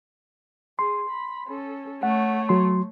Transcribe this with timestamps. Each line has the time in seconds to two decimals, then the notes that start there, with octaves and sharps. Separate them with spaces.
0.79 G#4 C6
1.10 B5
1.48 C#4 A4
2.03 A3 C#5 F#5
2.49 F#3 C6